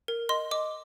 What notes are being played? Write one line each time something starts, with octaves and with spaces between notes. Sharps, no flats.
A#4
D#5 C6
D#5 D6